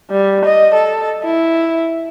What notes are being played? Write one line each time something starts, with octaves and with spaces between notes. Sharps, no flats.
G3
D#5
A4
E4